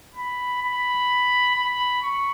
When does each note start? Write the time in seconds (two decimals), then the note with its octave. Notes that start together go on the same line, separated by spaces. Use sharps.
0.15 B5
0.62 B5
1.55 B5
2.02 C#6